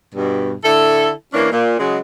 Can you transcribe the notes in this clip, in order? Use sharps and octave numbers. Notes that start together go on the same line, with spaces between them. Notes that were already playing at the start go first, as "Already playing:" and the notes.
G2 B2
D3 E4 A4
E3 A#3 C#4 D4
A#2
C#3 F#3 G#3